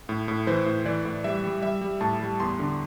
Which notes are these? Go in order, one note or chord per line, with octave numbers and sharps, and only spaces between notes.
A2
A2
E3 C5
A2
E3 D5
A2
G3 E5
G3
G3 E5
G3
A2 A5
G3
E2 C6
D3